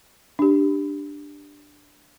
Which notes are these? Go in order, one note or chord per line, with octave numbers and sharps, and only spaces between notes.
D4 G4